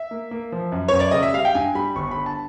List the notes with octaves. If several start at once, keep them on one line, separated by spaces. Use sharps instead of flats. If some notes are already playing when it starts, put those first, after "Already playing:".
Already playing: E5
A#3
A#3
F3
F#2
F#2 C#5
D5
C#3 D#5
E5
G3 F5
G5
G2 G#5
G3 B5
G1 C#6
D3 B5
A5